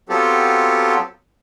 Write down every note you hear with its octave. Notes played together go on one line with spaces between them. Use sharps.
F#3 B3 C4 F4 G4 A4